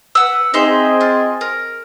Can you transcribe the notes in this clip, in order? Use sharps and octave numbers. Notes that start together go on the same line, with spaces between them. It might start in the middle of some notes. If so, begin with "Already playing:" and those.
B4 F#5 E6
C4 D#4 G#4 D#5 E5 C6
F4
A#4